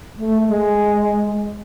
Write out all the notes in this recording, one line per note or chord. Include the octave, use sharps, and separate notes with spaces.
A3
G#3